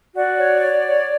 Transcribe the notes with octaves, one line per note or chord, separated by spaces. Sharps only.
F#4 D5
C#5
C#5
C#5